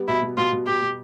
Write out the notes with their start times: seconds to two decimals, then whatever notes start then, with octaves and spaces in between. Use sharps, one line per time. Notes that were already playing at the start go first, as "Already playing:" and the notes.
Already playing: G3 B3
0.08 B2 E4
0.22 B2
0.37 B2 F4
0.52 B2
0.67 B2 G4
0.82 B2